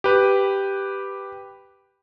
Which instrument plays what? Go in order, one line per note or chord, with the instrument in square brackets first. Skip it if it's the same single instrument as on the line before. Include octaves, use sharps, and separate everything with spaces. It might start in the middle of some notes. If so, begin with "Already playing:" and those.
[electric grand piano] G4 B4